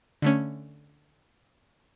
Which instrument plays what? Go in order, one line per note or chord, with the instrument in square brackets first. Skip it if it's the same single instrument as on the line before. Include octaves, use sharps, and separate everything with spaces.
[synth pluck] D3 A3 C#4